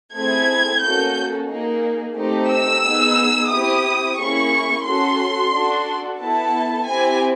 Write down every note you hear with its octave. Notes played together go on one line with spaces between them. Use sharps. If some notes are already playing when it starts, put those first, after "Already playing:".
A3 C4 E4 G#4 G#6
A#3 C#4 F#4 A4 G6
A#3 D#4 G#4
A3 C4 D#4 G4
E6
B3 D#4 G#4
C4 E4 G4 D#6
A#3 C#4 E4 G#4 C#6
C#4 F#4 A4 C6
D4 F#4 A4
B3 E4 A4 A5
C4 E4 G4 G#5